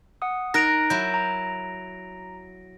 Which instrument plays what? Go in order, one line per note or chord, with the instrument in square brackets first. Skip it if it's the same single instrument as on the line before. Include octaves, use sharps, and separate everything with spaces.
[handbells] F#5 D#6
[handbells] D#4 F#6 [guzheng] A#4 [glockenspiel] A#6 D7 F7
[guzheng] F#3 E4 [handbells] G6
[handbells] A#5